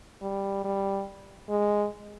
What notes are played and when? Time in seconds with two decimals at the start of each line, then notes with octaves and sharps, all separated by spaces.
0.22 G3
0.64 G3
1.49 G#3